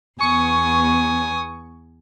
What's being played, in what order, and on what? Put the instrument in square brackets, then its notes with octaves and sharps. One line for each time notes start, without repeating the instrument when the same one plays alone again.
[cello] E2 B3 [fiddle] G#5 D#6 [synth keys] C#6